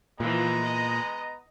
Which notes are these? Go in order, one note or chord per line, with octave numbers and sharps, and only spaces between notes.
A#2 E3 F3 G#3 B3 A#5
D#5